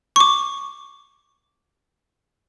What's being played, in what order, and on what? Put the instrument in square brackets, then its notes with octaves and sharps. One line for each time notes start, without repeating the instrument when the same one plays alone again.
[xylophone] C#6 D6